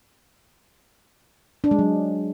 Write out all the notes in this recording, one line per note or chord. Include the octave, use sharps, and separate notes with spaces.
D4
G#3
F#3